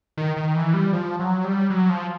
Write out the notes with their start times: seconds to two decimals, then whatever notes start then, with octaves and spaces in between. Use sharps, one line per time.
0.17 D#3
0.37 D#3
0.55 E3
0.74 G3
0.93 F3
1.20 F#3
1.44 G3
1.70 F#3
1.89 F3